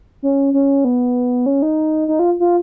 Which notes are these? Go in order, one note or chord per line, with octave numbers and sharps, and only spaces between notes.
C#4
C#4
B3
C#4
D#4
D#4
F4
F4